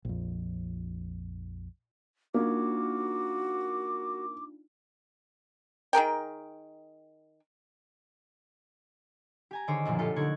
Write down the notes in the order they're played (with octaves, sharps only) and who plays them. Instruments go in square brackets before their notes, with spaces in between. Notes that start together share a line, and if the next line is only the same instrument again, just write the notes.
[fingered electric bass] A#1 F2
[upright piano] A#3 [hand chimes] D4 D#4 F4 [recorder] F#4 [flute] D6
[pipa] D#3 G#4 A#4 G5
[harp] G4 G#5 A#5
D3 D#3 G#4 C5 C#5 D6
B1 F#2 A#2 F3
F4 G4 A4
D3 D#4 A#4 C#6 F#6 G#6